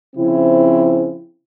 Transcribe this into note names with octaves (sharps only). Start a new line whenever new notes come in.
C#3 F3 C4 E4